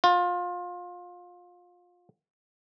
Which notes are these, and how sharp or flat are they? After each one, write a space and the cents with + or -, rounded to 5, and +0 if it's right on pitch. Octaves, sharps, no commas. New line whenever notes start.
F4 +25